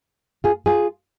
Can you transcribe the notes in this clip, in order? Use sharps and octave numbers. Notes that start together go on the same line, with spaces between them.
F4 G#4
F4 G#4